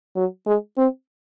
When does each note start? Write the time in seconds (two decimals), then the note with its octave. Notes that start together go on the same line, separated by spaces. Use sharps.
0.16 F#3
0.46 G#3
0.77 C4